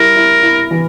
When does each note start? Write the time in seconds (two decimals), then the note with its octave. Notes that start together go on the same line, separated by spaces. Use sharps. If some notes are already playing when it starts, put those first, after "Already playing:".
Already playing: G3 E4 A#4
0.16 E4
0.43 E4
0.71 E3